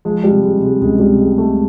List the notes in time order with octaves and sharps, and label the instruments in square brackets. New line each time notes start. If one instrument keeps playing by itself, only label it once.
[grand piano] F3 G#3
G3
C3
G#3
C3
G#3
C#2 G#3
G3
C3
G#3
C3
A3